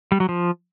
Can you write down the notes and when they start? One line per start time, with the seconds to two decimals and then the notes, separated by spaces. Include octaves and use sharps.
0.12 G3
0.20 F#3
0.29 F3